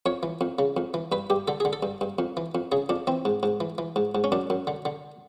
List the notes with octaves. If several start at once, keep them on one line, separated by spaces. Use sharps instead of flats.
F2 C#5
E3
F2
C#3
F2
E3
G2 B4
G2 G4
D3 A4
D3 G#4
A4
G2
G2
F2
E3
F2
C#3 G#4
F2 D4
E3 C4
G#2
G#2
E3
E3
G#2
G#2
C#4
F#2 D4
F#2
D3
D3